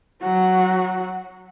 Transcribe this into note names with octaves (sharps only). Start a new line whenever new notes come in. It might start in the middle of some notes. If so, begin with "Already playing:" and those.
F#3 F#4